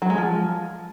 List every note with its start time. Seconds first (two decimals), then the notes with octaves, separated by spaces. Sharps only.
0.02 F#3
0.10 G#3
0.18 F3